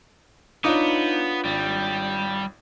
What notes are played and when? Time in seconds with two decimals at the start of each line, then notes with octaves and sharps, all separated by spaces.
0.64 B3 D4 D#4 F4 C#5 D6 D#6
1.45 G#1 G3